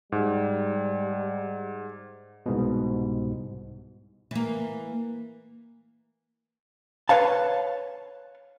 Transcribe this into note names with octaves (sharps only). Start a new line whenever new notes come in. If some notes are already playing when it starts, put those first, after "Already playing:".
G#2 G3
C2 G#2 B2
E3 A#3
B4 C#5 F5 A5